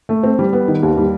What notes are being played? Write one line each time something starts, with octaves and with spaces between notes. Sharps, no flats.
A3
C4
G3
B3
D#3
D#2
G3